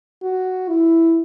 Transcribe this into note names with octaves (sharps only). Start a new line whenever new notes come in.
F#4
E4